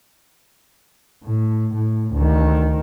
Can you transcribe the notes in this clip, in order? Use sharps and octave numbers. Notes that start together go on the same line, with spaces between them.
A2
A2
D2 D#3